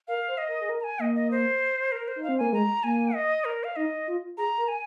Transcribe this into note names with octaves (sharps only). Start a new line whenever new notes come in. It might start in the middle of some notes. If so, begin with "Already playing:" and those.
A#4 F5
C5
D#5
A#4
G#4
A#4
A#5
G#5
A#3 D#5
D#5
C5
A#4
C5
D#4
F5
C4
A#3 G#5
G#3 A#5
A#3 G#5
D#5
A#4
F5
D#4 D#5
F4
G#4 A#5
A#4
G#5